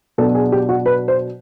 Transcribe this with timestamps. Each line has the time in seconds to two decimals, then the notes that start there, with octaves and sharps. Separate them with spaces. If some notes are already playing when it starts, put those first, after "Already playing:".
0.18 B2 F#3 B3 D4 A4
0.35 G#4
0.52 G4
0.69 F#4
0.86 B4
1.08 C5